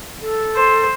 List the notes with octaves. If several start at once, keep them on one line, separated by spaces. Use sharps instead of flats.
A4
C5